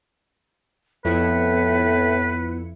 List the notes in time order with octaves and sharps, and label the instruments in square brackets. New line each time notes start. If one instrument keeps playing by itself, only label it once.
[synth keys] F2 E4 C#7 [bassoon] A2 [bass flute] B3 [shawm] B4